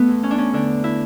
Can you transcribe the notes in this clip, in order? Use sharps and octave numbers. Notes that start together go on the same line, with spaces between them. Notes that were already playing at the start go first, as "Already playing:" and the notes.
Already playing: A3 B3
E2
C#4
D4
C#4
D3 D4
E4